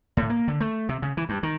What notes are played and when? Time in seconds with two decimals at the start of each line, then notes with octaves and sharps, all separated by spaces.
0.17 A2
0.30 A#3
0.48 D3
0.60 A3
0.89 C3
1.02 C#3
1.17 E3
1.29 G2
1.43 D#3